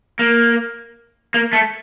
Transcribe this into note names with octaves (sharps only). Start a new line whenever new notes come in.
A#3
A#3
A3